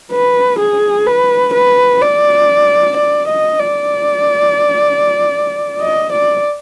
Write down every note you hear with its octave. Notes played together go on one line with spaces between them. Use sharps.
B4
G#4
B4
B4
D5
D5
D#5
D5
D#5
D5